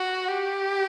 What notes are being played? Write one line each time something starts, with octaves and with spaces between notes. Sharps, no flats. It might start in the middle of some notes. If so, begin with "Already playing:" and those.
Already playing: F#4
G4